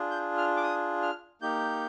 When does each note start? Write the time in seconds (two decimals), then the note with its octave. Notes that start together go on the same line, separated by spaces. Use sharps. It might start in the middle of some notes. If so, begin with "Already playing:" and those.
Already playing: D4 F4 G#4
0.11 G6
0.37 F6
0.57 D6
0.63 D#6
1.02 F6
1.42 A#3 D#4 G4 G6